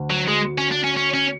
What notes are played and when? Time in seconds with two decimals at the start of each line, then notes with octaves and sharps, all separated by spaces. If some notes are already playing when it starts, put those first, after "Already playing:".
Already playing: D2
0.10 F#3
0.28 G#3
0.58 C#4
0.71 D4
0.84 C#4
0.97 C#4
1.14 C#4